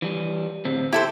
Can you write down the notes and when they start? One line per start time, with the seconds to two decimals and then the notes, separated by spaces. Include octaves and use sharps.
0.02 E3 G3
0.65 D2 A2 C4
0.93 E4 G4 A4 C5